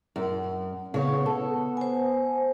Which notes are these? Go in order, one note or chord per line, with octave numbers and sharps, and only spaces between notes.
F#2
C#3 B3 C#5
A4
C5 G#5